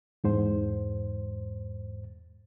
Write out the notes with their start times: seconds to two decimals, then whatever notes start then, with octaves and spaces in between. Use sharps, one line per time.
0.24 E2 G#2 C5